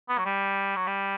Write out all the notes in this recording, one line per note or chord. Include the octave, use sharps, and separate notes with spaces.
B3
F#3
G3
F#3
G3